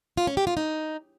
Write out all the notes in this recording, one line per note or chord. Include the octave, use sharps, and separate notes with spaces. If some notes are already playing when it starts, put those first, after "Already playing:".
F4
C#4
G4
F4
D#4